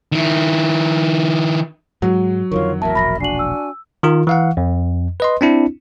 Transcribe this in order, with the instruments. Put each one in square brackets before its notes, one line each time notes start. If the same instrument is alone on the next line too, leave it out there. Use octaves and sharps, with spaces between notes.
[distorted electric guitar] D#3 E4
[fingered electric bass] G#2 G#3 [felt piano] F#3
[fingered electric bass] F2 D3 D#3 [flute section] F4 C#5 C#6 [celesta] A#4
[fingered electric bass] A1 E2 [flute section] A#4 E5 [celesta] A5
[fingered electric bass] E1 A#1 [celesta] B5 A#6
[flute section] D4 F#4 G#5 [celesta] C7 F#7
[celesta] E6
[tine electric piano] D#3 F4 A#4
E3 F5 F#5
F2
B4 D#5 C6
C4 D4 E4